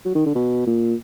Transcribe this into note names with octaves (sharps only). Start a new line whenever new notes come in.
F#3
D#3
D3
B2
A#2